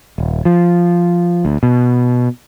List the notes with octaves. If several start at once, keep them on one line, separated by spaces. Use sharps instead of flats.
D#1
F3
D2
B2